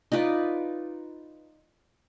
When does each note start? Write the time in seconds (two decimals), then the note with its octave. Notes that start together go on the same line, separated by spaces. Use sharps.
0.12 D#4 F4 B4 D5